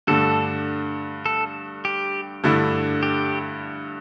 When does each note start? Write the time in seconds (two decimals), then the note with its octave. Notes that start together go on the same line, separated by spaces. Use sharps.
0.07 G2 D3 A3 A4
1.26 A4
1.85 G4
2.44 G2 D3 A3 E4
3.03 G4